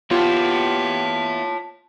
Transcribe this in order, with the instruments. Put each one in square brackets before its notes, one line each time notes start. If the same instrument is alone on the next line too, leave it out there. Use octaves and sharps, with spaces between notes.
[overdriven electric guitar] B3 E4 [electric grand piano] F4 [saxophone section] G4 [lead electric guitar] C#5 A5